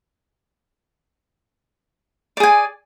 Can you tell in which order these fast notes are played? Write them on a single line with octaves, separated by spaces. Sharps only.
D5 G#4 G#5